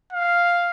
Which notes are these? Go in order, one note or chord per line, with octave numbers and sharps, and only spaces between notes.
F5